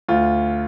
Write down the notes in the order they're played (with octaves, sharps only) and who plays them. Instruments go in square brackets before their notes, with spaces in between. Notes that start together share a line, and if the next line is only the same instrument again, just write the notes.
[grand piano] D2 F4